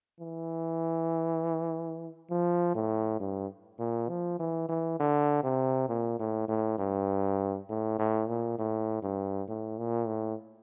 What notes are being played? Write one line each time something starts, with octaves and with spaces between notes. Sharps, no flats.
E3
F3
A2
G2
A#2
F3
E3
E3
D3
C3
A#2
A2
A2
G2
A2
A2
A#2
A2
G2
A2
A#2
A2